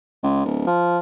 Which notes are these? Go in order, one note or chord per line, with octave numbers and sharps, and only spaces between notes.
C#2
D1
F3